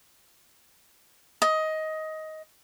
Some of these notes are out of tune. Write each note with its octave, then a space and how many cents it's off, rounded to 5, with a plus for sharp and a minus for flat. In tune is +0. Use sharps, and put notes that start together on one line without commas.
D#5 +15